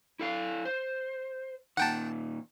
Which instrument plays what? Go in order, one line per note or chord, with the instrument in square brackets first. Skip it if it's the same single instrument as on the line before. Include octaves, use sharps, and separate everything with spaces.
[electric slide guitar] E4 A4 F5
C5
[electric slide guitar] A#2 D#3 [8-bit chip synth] F#5 G5 A5